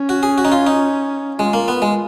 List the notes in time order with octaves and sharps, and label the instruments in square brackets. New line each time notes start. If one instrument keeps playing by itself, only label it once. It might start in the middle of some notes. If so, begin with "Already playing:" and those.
Already playing: [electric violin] C#4
[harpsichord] F#4
G#4
F#4
D#4
F4
D#4
[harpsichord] G#3 [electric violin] F4
[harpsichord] A#3
B3
G#3